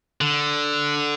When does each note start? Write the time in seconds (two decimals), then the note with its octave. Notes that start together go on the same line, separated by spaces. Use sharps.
0.21 D3